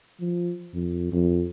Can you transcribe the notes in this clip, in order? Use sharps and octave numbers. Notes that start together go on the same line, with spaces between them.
F3
F2
F2